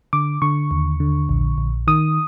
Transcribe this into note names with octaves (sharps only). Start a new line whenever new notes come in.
D3 D6
D3 C#6
D#2
D3
A#1
A#1
D#3 D#6